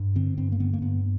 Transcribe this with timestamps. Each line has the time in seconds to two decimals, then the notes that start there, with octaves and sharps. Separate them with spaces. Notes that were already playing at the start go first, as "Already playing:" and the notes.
Already playing: G2
0.15 D3 C4
0.38 G2 C4
0.52 A#3
0.60 D3 B3
0.74 A#3
0.82 G2 B3